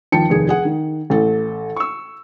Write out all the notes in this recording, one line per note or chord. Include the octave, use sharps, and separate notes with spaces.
D#2 F3 G5 A5 C#7
F1 D#2 G#4
G#4 F#5
D#3
A1 A3 A4
C#6 E6